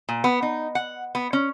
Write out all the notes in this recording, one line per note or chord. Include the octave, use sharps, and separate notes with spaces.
A#2
B3
D#4
F#5
B3
C#4